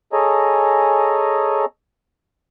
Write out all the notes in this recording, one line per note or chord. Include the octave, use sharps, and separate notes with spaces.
G#4 A4 C#5 D#5 G#5 A#5